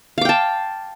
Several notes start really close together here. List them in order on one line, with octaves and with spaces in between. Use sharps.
F5 D6 G5 A5